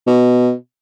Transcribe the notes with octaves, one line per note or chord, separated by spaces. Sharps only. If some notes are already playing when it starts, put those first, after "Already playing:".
B2